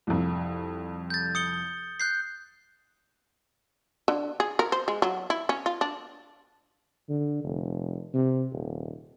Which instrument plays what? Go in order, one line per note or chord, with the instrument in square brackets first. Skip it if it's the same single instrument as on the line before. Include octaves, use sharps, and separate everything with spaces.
[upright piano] C2 F2
[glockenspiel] G6 A6
D#6 C#7 G7
F#6 G6 C7
[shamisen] D3
G#4
A#4
C5
G#3
F#3
E4
C#4
F4
D4
[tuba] D3
F1
C3
D#1